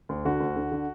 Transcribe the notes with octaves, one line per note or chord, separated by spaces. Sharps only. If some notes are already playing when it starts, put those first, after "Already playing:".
D2
D3 F#4
D2
D3
D3